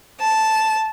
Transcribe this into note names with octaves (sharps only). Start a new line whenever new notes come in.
A5